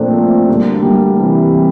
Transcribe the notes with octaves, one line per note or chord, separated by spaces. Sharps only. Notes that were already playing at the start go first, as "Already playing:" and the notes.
Already playing: A#2 F3 A3 A#3 C4 D4 A4 C5
A3
D2 D3 G3 A3 A#3 D4
G3 A#3
C2 C3 E3